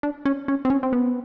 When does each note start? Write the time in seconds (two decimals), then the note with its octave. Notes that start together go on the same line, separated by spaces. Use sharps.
0.03 D4
0.25 C#4
0.48 C#4
0.65 C4
0.70 C#4
0.83 C4
0.93 B3